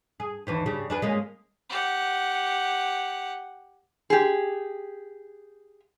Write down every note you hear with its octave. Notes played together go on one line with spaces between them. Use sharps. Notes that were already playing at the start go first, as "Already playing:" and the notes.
G#4
D#2 E3 D4
C#3 G3
D4 G#4 B4
G#3 A#3 C#4
G4 F#5
G4 G#4